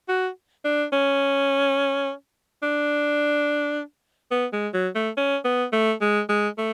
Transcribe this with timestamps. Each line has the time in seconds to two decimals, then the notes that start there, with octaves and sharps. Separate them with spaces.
0.08 F#4
0.65 D4
0.93 C#4
2.63 D4
4.31 B3
4.53 G#3
4.74 F#3
4.95 A3
5.17 C#4
5.45 B3
5.73 A3
6.01 G#3
6.29 G#3
6.58 A3